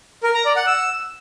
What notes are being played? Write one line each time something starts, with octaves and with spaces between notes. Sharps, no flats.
A#4
A#5
D5
F#5
E6